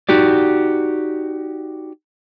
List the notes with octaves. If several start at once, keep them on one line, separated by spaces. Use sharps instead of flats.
D#4 F#4 G4 D5